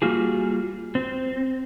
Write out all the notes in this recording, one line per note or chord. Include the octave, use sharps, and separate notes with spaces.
G3 A#3 F4 F#4 G#4
C4